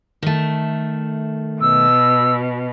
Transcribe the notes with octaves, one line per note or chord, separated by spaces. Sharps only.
D#3 A3
B2 E6